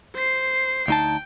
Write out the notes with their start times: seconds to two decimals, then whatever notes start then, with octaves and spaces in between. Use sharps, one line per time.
0.15 C5 C7
0.88 D2 D#4 G5 A5